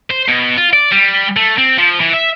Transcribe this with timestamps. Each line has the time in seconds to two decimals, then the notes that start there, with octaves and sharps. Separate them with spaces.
0.11 C5
0.29 B2
0.57 F4
0.73 D5
0.92 G3
1.36 A3
1.58 C4
1.78 F3
2.00 E3
2.13 E5